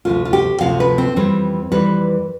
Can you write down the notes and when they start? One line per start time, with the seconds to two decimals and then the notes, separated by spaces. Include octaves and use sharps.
0.05 D2 C3 F3 F4
0.25 F4
0.33 G4
0.61 D2 C3 F3 F5
0.80 B4
0.98 C4
1.16 F2 E3 G3 C4
1.72 F2 E3 G3 B4